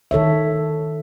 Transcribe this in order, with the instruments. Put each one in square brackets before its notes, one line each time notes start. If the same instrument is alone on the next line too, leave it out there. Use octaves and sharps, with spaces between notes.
[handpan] D#3 A4 C#5 E5